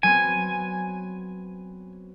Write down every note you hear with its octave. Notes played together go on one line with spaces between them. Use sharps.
F#3 B3 C4 G#5